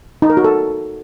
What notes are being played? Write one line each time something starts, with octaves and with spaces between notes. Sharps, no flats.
D#4
A#4
F#4
A4